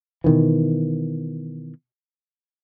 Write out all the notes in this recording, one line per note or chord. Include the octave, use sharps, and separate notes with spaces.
B2 D#3 E3